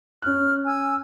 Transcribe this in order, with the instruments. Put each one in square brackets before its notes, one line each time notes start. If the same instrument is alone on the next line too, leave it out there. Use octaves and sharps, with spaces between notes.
[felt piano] C#4 F#6 [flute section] F6
[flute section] G#5 E6